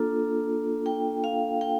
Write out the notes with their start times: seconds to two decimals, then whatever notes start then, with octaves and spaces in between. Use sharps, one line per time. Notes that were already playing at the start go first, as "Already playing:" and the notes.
Already playing: A#3 D4 F4 A4
0.86 G5
1.24 F5
1.61 G5